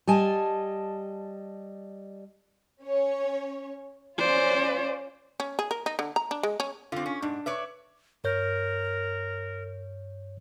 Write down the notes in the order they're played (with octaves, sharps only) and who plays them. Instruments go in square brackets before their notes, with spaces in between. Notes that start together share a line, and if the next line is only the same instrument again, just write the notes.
[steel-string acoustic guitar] G3 D#5 G#5 A5
[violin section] C#4 C#5
[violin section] C#4 F4 [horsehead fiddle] C5 D5
[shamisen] C#4
G#4
A#4
D#4
D3
A#5
D4
G#3
C#4
[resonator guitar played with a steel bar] D3 C4 [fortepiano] F4
[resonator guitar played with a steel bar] C#4
[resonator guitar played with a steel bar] G#2 [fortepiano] D4
[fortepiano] B4 [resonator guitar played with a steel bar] C#5 D5 E5
[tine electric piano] G2 C#5 G6 [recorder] A#4